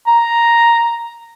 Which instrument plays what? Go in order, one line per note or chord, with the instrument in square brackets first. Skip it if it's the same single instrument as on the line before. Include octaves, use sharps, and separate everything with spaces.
[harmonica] A#5